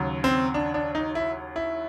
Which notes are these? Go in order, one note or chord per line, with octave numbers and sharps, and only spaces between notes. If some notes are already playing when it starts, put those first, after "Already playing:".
Already playing: D#2 C#3 F#3
C4
D4
D4
D#4
E4
E4